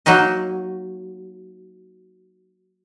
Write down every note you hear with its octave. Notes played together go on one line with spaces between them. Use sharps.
F#3 A#3 D#4 D#5